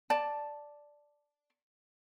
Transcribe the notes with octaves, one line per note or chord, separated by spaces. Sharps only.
D5 A5